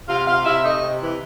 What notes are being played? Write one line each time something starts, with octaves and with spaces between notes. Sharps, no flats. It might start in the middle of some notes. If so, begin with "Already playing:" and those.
C3 F4 F5
C3 F4 F5
C3 E4 E5
A3 D#4 D#5
C3
E3